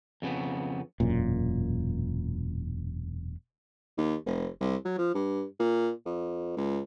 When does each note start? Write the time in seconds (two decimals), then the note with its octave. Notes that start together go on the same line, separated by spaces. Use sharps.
0.22 F2 C#3 B3
1.00 E1 F#2 A#2
3.98 D#2
4.26 F1
4.60 C2
4.85 F#3
4.98 F3
5.14 G2
5.59 A#2
6.05 F2
6.57 C#2